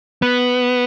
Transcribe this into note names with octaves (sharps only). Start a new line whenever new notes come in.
B3